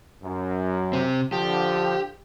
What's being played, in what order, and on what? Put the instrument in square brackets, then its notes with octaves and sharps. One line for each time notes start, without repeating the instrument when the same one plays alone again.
[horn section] F#2
[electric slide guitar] C3 C4
[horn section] D3 F3 [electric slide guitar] G4